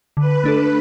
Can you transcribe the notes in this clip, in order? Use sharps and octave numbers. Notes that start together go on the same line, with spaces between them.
D3 B4
A3 D4 A4